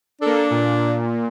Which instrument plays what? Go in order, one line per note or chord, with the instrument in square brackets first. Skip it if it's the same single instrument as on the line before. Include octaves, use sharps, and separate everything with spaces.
[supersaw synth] A#3 A4 [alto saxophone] D4
[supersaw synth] A#2